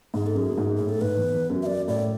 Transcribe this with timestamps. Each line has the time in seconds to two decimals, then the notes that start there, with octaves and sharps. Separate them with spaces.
0.14 G#2 G#4
0.26 A4
0.35 F#2 G#4
0.52 F#2
0.58 G#2
0.76 A2 G#4
0.89 A4
1.01 G#2 B4
1.17 E2
1.34 E2
1.50 F#2
1.62 E5
1.66 F#2 D5
1.88 A2 D5